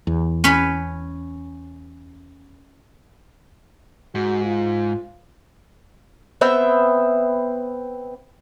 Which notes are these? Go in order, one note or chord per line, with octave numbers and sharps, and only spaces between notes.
E2
C#4 B4 C#5
G#2 F#4
F4
B3 C4 E5 G5